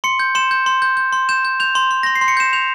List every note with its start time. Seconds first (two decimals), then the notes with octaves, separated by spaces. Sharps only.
0.04 C6 C#7
0.20 G6
0.35 C6 E7
0.51 G6
0.66 C6
0.82 G6
0.97 G6
1.13 C6
1.29 G6 E7
1.45 G6
1.60 G6 F7
1.75 C6
1.91 C6
2.03 C6 A#6
2.15 C7
2.21 C6
2.28 C#7
2.37 G6 E7
2.53 G6 F7